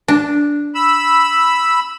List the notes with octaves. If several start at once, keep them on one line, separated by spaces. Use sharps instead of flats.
D4
B5 E6